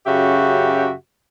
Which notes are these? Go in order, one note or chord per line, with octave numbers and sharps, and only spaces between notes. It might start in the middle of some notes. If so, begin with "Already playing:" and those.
F#2 C#3 F#4 G4 E5